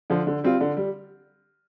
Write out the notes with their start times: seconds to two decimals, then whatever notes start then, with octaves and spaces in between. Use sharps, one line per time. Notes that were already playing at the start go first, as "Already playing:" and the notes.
0.10 D3 F3
0.27 D3
0.44 G3 C4 F4
0.61 D3
0.77 G3